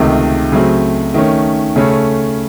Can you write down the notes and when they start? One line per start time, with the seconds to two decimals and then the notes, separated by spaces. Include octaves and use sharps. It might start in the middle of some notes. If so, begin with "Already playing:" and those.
Already playing: C#2 C3 D#3 A3
0.52 C#3 F#3 A3 C4
1.14 D#3 A3 C#4
1.76 C#3 A3 C#4 A4